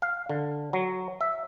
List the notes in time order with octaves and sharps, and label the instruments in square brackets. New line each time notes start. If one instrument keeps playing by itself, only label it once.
[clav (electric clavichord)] F5
D3
F#3
E5